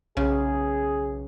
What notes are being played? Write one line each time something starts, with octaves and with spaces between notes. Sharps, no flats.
B1 C#3 G#4